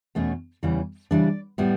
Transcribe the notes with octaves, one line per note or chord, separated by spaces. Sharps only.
E2 B2 A3 C#4
E2 C#3 E3 G3 C#4
C#3 E3 G3 D4 D5
A2 G3 B3